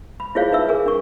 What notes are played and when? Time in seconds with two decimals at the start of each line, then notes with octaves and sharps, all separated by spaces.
0.20 B5
0.35 E4 F4 G#4 C5 C#5 F5
0.52 D#4 B4 E5 E6
0.68 G#4 A#4 G#5
0.86 D4 C#6